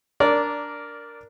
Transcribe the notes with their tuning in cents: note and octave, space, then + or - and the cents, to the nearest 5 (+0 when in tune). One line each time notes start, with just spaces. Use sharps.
D4 -5 A#4 +0 D5 -15